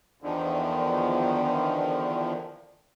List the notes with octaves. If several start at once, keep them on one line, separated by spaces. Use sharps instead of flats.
E2 D3 D#3 F3